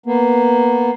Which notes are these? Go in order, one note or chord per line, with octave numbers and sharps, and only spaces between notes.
A#3 B3